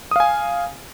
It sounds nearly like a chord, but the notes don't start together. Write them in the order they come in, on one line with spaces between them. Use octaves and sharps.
D#6 F5 G#5